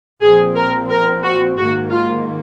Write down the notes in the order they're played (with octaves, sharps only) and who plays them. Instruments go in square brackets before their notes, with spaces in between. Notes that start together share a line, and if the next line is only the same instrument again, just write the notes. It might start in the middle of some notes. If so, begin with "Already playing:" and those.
[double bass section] A#1 A#2 F3 C4 [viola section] G#4
[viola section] A#4
A#4
F#4
[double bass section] G#2 D#3 A#3 [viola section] F#4
[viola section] F4